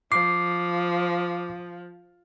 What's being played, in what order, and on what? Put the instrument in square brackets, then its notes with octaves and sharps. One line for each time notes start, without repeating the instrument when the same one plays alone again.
[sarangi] F3 [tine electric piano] D6 C7